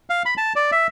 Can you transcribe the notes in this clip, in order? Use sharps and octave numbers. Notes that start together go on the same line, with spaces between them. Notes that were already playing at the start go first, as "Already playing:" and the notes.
F5
B5
A5
D5
E5